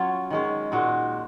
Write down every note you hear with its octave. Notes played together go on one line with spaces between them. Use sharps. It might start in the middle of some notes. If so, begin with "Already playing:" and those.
Already playing: F#3 C#4 F4
D#3 G#3 C#4
A#2 G#3 D#4 F#4